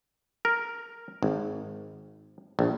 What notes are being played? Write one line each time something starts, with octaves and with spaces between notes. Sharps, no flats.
A#4
G#1
A#1